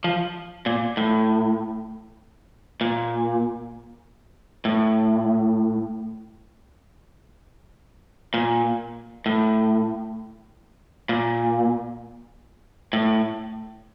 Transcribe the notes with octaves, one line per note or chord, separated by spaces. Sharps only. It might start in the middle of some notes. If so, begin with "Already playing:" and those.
F3
A#2
A2
A#2
A2
A#2
A2
A#2
A2